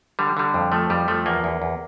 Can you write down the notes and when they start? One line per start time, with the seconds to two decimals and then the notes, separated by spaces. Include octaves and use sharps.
0.19 D3 G3
0.37 D3 G3
0.54 F2
0.72 F3 A3
0.90 F2 G3
1.08 F3 A3
1.26 E2 A#3
1.44 E2
1.62 E2